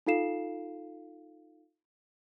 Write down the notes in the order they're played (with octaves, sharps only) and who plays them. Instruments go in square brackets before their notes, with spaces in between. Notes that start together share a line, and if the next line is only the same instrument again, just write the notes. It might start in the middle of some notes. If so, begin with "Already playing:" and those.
[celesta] D#4 F4 A4 F5 C7 E7